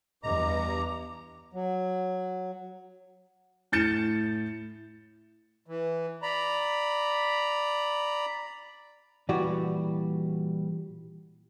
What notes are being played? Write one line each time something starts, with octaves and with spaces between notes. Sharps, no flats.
E2 G2 D#5 A#5 D6
F#3
A2 G6 A6 C#7 E7
E3
D5 A#5 B5
A#2 E3 G3 F#4 D5